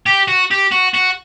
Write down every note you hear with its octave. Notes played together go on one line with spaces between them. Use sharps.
G4
F#4
G4
F#4
F#4